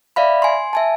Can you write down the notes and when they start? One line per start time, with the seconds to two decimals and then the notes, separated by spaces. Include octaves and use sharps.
0.16 D5 E5 F5 B5
0.42 G#5 C6
0.73 E5 G#5 A5